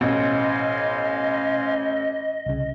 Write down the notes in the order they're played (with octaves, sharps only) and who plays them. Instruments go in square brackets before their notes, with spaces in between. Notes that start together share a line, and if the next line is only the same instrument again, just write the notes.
[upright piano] A1 [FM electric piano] B2 [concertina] C5 F5 G#5 [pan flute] D#5
[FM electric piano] C2 C#3